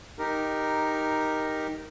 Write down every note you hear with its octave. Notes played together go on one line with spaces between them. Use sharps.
D#4 G4 A#4